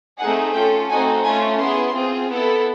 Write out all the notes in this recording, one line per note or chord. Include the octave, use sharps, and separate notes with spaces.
A3 C4 D#4 G#4 F#5
C#4 F4 A4 G5
A3 C4 D#4 F#4 A4 G#5
A3 C#4 F4 G#5
B3 E4 G#4 C6
C4 F4 G#4
B3 E4 A4